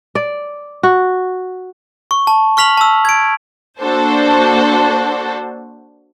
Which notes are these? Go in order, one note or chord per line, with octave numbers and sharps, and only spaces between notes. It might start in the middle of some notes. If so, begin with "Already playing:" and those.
D5
F#4
C#6
A5
C#6 F6 B6 F7 F#7
A5 E6
G#6 D7
A#3 D4 F#4 A4 C5